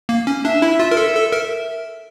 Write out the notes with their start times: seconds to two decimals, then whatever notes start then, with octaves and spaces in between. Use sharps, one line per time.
0.09 A#3
0.27 C#4
0.45 D4 E5
0.62 E4
0.80 F4
0.91 A#4
0.97 A4 E5
1.15 A4
1.32 A#4